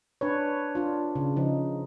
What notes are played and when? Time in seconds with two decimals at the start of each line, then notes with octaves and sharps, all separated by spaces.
0.21 D4 B4 C#5
0.75 D4 F4
1.16 C#3
1.37 C#3 F3 D#4